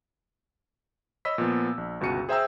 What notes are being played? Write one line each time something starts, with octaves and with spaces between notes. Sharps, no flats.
C#5 D#5 B5 E6 B6
A#2 F3 B3
A#1
G1 C#2 B2 F#4 C#7 D#7
G#4 C5 E5 G5 A#5 E6